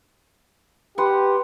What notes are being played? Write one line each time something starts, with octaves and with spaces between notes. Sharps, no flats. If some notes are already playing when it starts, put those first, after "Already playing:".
G4 B4 F#5 C6